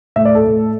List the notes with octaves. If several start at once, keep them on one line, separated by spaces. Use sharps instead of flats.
A2 A3 E5
D5
A4
A2 A3